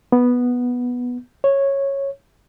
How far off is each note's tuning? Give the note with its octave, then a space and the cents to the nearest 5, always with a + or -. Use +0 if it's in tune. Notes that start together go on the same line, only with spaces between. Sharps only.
B3 -5
C#5 -10